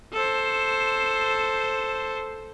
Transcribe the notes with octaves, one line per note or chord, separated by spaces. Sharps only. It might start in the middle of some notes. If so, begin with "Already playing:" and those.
A4 C5